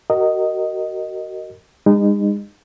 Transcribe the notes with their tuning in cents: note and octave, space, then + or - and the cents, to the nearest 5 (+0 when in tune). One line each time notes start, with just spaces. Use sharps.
F#4 +30 A#4 -15 D#5 +0
G#3 -40 D#4 -25